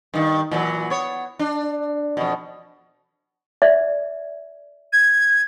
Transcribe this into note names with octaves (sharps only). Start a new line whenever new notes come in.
G2 D#3
A#2 E3 F#3
B3 C#5
D4
F2 B2
D5 E5
G#6